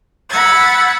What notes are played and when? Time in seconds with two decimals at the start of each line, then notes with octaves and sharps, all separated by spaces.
0.29 F#5 B5 E6 G#6 A6